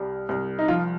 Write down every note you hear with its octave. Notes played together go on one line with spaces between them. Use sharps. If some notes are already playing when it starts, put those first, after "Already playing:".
Already playing: C2 G3
C2
D#4
F3 F4